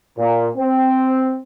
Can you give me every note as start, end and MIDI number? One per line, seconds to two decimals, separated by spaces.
0.18 0.48 46
0.57 1.39 60